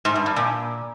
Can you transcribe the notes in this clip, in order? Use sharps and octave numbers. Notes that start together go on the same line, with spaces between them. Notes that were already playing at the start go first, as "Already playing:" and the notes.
G#2
G2
G2
A#2